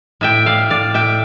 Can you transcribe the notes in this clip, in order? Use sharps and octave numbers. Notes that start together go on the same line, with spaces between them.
A2 E5 G5
A2 D5 F5
A2 D5 F5
A2 E5 G5